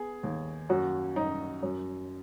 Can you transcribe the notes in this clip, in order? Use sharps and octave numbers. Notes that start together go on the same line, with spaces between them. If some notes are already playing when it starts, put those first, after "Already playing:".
Already playing: B3 G#4
D#2
F#2 F#4
F#2 D#4
F#2